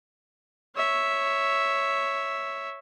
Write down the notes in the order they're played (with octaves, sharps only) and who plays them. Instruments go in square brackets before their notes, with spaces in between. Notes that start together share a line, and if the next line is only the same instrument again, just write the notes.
[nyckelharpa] C#5 E5